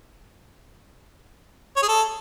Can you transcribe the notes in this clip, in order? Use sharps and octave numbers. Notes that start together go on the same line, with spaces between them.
C#5
G#4
A4